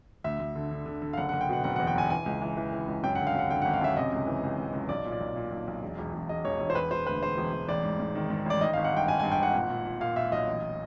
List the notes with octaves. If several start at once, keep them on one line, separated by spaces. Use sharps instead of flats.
D2 E5
D2
D3
D3
D3
D3
F5
F#1 F#5
F#5
F#1
G5
B2 F#5
F#1 F#5
F#5
E2
G5
F#1 G#5
E3 G#5
C#2
E3
E3
E3
C#2
F#2 G5
F#5
D3
F5
F#2 F#5
D3 G5
F#5
G#1
F5
F#2 E5
C3 D#5
C#2
E3
C#2
C#2
C#2
B1 D5
A#2
D5
B1
A#2
B1
B1
E1
E1
E1
E1 D#5
E1 C#5
E1
C5
E1 B4
E1 C5
D2 B4
E1 C5
E1
E1
A1 D5
G#2
G#2
D#3
G#2
A1 D5
D#3 D#5
F5
G#1
F#5
G2 G5
G#1 G#5
G#5
G2
G5
G#1 F#5
A#2
A#2
A#2
A#2 F5
A#2 E5
B1 D#5
A1